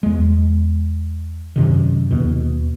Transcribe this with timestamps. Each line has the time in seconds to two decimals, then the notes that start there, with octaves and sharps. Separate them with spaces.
0.03 E2 G#3
1.56 F#2 C3 D#3
2.11 D#2 B2